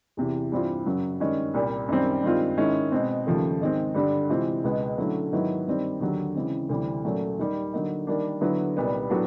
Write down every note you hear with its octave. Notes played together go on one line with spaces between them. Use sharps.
E2 C3 E3
G2 E3 G3 C4 F4
F#2 C#3 F#3
G2 D#3 G#3 C#4
C2 A#2 G3
F#2 D#3 G3 C4
G2 D#3 G#3 C4 F4
G#2 D#3 G#3 C#4 E4
B2 G#3 C4
D#2 C#3 F3 A3
G#2 D#3 G#3 C4
G2 D3 G3
C3 E3 G#3 C4 F4
C#2 B2 G#3 B3
D3 F#3 A3 C#4 E4
G#2 D#3 F#3 B3 E4
G2 D#3 G3 C4
D#2 D3 F#3
C#3 E3 G#3 C4
D2 C3 E3 G3 C4
A#2 F#3 A3 C#4
D#2 D#3 G3
D3 F#3 A#3 D#4
D#3 G3 A#3 D4
D3 F#3 B3 E4
C2 A#2 G3 B3 D#4
A2 F#3 B3 D4 F#4